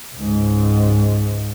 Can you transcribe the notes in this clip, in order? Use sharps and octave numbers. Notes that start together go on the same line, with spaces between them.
C#2 G#2